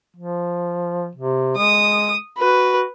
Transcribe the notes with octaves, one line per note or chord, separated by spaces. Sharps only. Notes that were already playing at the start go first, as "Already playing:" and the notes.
F3
C3
G#3 D#6
F#4 B4